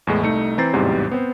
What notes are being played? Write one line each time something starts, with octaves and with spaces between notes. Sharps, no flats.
E2 A2 G#3
C2 A3 D#4 C#7
E3 C4 A#5 G6 A6 C7
A1 E2 G#2 C3 F#3 G3
B3 C4 C5